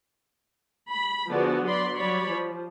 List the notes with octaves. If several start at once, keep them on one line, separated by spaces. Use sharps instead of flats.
B5
D3 F3 B3 F#4 G#4 D5
F#3 D5 B5 C6
F#3 G3 C#5 D5 B5
F3